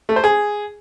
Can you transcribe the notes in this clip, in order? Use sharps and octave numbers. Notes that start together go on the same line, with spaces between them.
A3
C5
G#4